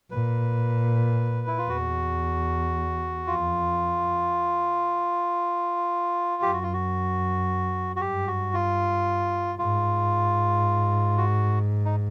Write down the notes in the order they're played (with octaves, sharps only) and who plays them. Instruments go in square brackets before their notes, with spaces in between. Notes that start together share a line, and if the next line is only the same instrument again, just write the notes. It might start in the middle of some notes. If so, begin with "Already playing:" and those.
[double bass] A#2 [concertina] B4
[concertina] E4
F4
[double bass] E2 [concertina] F#4
[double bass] F2 [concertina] F4
[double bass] F#2 [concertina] G4
[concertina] F#4
F4
F#4
F#4
[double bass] G2 [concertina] G4
[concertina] F#4
F4
[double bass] G#2 [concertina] F4
[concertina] F#4
D#4